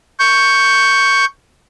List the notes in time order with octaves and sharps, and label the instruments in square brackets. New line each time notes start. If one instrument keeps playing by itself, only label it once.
[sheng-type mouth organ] C#6 G6